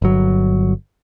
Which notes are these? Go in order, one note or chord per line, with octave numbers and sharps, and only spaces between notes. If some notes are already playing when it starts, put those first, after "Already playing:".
G1 F#3